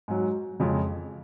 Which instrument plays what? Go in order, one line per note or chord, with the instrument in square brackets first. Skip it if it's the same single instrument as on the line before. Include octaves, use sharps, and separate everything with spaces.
[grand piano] G#2 F#3
F2 C#3 G#3